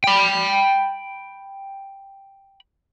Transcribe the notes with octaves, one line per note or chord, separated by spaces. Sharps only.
G5 B5